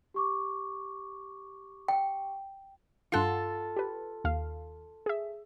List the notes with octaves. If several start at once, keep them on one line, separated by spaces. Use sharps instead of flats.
G4 C#6 D6
G5
G2 F4 A4 F#5 C6
G4 B4
D#2 F5
G#4 E5